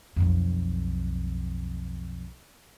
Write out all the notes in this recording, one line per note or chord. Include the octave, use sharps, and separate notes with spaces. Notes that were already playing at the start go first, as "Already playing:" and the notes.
B1 F2